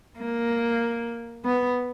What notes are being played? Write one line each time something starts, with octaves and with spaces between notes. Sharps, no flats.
A#3
B3